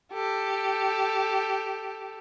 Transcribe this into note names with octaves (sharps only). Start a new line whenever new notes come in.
G4 A4